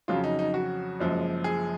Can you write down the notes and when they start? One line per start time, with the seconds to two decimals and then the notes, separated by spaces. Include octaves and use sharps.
0.08 F2 C#3 F#3 F4
0.24 D#4
0.39 D#4
0.54 F#4
1.00 F#1 F#2 F3 G#3
1.44 G#4